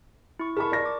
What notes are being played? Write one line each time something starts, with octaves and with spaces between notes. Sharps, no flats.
E4 C#6
G#4 A#4 A5 B5 C#6
D5 A#6
D6